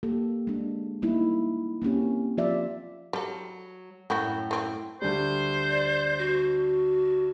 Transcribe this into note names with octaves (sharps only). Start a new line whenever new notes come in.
A#3 G4 A4
G#3 D4
G3 A#3 B3 D#4 E4
A#3 C4 C#4 G4
F3 F4 G4 D5 E5
F#3 G3 A4
F#2 A2 A3 E4 F#4 G5
A3 C4 E4
D2 G3 C5
D5
F#4